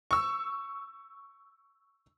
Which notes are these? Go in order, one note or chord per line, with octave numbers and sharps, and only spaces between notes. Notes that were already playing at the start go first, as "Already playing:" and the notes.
C#6 E6